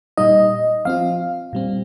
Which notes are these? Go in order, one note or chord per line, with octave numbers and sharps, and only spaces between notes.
A#2 G3 D#4 D#5
F3 C4 F4 F5
A#2 G3 C4